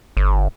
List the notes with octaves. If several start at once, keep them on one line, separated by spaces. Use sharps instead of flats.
G1